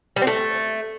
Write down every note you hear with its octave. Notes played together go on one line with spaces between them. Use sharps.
G3
C4
A3